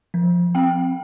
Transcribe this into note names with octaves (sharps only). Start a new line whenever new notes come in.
F3
C4 G5